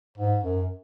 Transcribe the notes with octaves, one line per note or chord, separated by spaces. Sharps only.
G#2
F#2